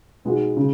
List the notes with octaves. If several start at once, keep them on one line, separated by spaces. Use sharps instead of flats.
B2 G#3 B3 D#4 F#4
C#3